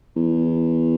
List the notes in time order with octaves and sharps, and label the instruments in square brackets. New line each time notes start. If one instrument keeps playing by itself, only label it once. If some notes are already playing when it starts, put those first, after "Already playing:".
[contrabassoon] E2